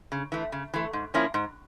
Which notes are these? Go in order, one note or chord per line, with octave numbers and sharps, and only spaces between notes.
C#3
E3 A3
C#3
E3 A3
G#2
F3 A#3 C#4 E4
G#2